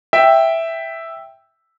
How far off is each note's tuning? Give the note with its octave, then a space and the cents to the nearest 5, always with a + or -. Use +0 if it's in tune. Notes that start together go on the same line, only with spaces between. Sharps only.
E5 +0 G5 +0